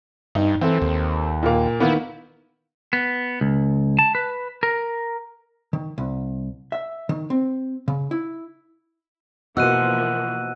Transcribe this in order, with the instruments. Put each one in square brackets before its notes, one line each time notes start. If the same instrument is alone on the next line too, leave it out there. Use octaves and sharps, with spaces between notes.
[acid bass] G2 [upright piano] D#4
[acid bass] E3 [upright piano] C4 A4
[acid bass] D#2
[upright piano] A#2 A#3
[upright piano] D#3 A#3 B3 [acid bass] E4
[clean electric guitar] B3
C#2
A5
B4
A#4
[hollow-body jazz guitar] D#3
C2
E5
D#3
C4
C#3
E4
[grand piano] B2 [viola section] E3 F3 A#3 [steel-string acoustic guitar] F#5 [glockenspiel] E6 F#6 D#7